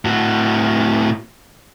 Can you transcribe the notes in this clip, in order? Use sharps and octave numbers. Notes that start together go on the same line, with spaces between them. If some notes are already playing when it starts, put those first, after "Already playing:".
A2 F#4